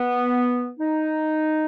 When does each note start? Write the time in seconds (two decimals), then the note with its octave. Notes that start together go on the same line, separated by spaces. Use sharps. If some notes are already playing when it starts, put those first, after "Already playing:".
Already playing: B3
0.80 D#4